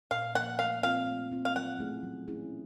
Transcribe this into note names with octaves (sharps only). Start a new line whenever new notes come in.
A#2 F5
F3 A#3 F#5
A3 F5
C4 F4 F5
A3
C4 F4
F5
F#3 F#5
A3 C#4 E4 G#4
F#3
A3 C#4 E4 G#4